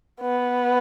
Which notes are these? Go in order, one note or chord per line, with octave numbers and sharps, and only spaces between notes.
B3